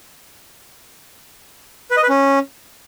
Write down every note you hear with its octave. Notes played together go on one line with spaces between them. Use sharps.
B4
D#5
B4
C#4